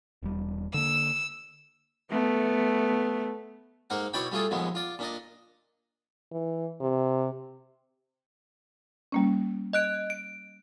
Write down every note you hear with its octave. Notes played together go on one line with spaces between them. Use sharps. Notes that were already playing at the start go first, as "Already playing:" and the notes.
E1 G3
D3 A#3 E6
A3 B3
G#2 A#3 F5 F#5
B2 E4 C#5 D5 G5 B5
G3 A3 F4 G#4 A4
A#1 D#2 G#3 B3
F4 D5
A#2 D4 D#5
E3
C3
G3 A#3 C#4
D#5 F#6 D7
D7